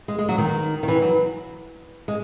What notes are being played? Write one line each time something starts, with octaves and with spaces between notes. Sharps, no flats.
G#3
G#3
F#3
D#3
D#3
E3
F#3
G#3